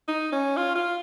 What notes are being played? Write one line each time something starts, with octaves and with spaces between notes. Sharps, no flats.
D#4
C#4
F4
F4